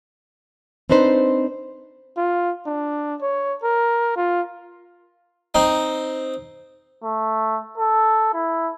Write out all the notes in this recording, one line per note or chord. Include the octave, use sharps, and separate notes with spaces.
C4 D4 D#4 B4 C5
F4
D4
C#5
A#4
F4
C4 D#4
A3
A4
E4